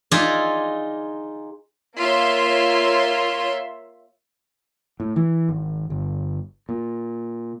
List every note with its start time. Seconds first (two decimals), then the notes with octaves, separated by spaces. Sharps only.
0.11 D#4 F4 G#4 D5 E5
1.98 A#3 F4 C#5 E5 C6
5.00 A2
5.16 E3
5.49 G#1
5.90 G1
6.69 A#2